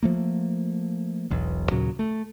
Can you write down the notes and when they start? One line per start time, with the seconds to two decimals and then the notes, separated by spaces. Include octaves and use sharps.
0.03 F3 A3 A#3
1.30 E1 B1 E2
1.71 D#2 A#2 C#3 F#3
1.99 A3